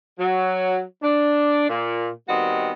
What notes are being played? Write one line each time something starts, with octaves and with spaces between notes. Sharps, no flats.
F#3
D4
A#2
D#3 G3 B3 C4 F#4 D#5